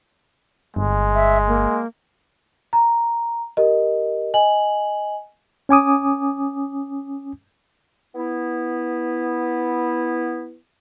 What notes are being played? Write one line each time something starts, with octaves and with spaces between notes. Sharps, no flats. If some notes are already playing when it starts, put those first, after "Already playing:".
G1 G#3
E5
A#3
A#5
G4 A#4 D#5
D#5 G#5 F#7
C#4 G#5 D6 D#6
B3 E4